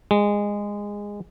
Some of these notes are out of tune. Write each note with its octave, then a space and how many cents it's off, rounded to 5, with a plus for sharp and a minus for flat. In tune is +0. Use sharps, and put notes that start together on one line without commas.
G#3 -15